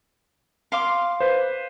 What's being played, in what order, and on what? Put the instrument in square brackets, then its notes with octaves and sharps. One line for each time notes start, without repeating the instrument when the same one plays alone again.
[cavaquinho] F5 C6 D6
[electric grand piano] B4 C5